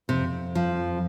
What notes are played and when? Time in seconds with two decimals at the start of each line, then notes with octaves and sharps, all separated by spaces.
0.08 F2 C3
0.55 F3